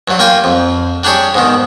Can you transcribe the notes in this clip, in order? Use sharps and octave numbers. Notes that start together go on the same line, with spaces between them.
G2 F#3
A#3 F4 G5 G#5
F2
G3 D4 G4 G#4 C#5
G#2 B2 D#3